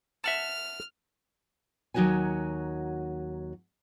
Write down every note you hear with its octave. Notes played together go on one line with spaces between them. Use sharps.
E5 F#5 A5 F6
D#2 F#3 D#4 F#4 C#5 G#5